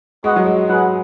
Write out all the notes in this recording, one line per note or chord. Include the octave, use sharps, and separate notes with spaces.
G#3 B3 F#4 D#5 F#5
F#3
G#3
F#3 G#4 B4 F#5